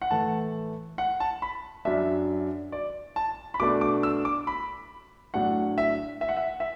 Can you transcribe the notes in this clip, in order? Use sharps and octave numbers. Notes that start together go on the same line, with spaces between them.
F#5
A2 E3 A3 A5
F#5
A5
B5
F#2 F#3 D4 E5
D5
A5
B5
B2 A3 D4 D6
D6
E6
D6
B5
A2 F#3 D4 F#5
E5
E5
F#5
E5
E5